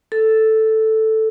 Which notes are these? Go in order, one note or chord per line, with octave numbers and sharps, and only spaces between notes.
A4